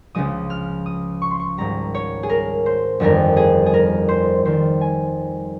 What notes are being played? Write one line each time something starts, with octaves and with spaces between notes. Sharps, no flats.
C#2 C#3 F3 G#3 D#6
F6
D#6
C#6
C6
C#6
G#1 G#2 G3 A#5
C#5
G#4
A#4
C5
G1 F2 D#3 G3 A#4
G#4
G#4
A#4
C5
F2 D#3 G3 C5
G#5